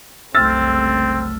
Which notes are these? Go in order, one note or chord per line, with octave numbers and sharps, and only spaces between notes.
F#1 C2 A3 C4 E6 F6 A6